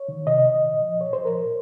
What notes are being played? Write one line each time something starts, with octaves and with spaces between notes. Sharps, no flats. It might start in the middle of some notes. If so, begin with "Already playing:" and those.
Already playing: C#5
D#3
C3 D#5
D#3
A#2
F3
A#2 C#5
C5
F3
A#4
A#2